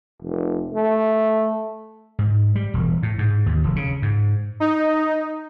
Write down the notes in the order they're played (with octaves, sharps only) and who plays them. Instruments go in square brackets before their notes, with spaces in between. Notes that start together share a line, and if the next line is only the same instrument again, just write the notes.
[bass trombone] F1
A3
[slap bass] G#2
G3
E1
A2
G#2
D#2
F1
C#3
G#2
[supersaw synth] D#4